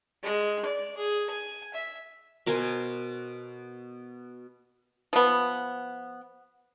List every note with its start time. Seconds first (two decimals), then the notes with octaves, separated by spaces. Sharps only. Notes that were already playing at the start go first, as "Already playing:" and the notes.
0.23 G#3
0.65 D5
0.97 G#4
1.30 G#5
1.74 E5
2.46 B2 A#4 C5 G#5
5.13 F3 B3